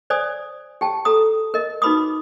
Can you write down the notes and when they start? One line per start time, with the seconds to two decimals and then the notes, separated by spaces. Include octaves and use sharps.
0.10 C5 D5 G#5 D#6
0.81 G4 G5 A5
1.05 A4 A#5 D#6
1.54 A#4 D#5
1.82 D#4 F#4 B4 B5 D6 D#6